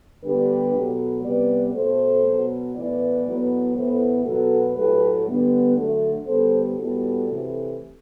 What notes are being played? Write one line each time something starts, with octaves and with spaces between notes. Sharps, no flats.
D3 G3 B3 G4 B4
B2 F#3 A3
C3 G3 B3 B4 D5
B2 A3 A4 C5
B2 F#3 B3
A2 E3 B3 B4 D5
A2 F#3 B3
A2 E3 B3 A4 C5
B2 F#3 B3 F#4 A4
A2 F#3 A3 G4 B4
D3 G3 B3
D3 F#3 A3
D3 G3 B3 A4 C5
A2 G3 B3 F#4 A4
C3 E3 A3